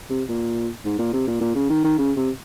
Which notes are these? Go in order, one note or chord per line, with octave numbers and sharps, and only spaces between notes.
C3
A#2
G#2
A#2
C3
A#2
A#2
C#3
D#3
D#3
C#3
C3